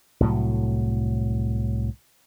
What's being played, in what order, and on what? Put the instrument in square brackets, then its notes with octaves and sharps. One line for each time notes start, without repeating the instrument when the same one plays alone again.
[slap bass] C2 A2 F#3